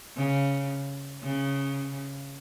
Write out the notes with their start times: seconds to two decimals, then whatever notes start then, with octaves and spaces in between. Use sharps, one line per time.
0.17 C#3
1.23 C#3